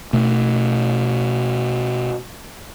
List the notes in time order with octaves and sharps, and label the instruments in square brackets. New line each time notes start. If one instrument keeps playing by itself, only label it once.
[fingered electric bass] B2 A3